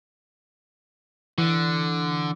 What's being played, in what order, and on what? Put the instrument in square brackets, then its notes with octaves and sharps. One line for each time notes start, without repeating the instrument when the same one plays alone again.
[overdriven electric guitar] D3 [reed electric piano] E3